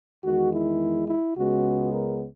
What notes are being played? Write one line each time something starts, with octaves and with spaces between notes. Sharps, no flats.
E2 D#3 G#3 F#4
E4
E4
C#2 C#3 G#3 B3 F#4
A#4